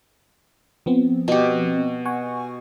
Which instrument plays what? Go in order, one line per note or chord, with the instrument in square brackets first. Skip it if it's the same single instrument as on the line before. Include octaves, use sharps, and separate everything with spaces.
[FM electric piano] F3 B3 C4
[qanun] B2 G4
[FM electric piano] F#5 G#5 C#6